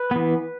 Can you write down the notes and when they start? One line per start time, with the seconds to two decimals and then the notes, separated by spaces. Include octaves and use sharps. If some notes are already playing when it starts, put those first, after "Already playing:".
Already playing: B4
0.11 E3 B3